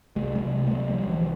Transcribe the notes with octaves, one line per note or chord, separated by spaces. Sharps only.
C2 F#3 G#3
F#3 G#3
C3
A3
C3 F#3 G#3
F3 G3
C2
E3 F#3